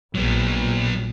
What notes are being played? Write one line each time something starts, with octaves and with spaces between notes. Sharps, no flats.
A#1 F#3 B3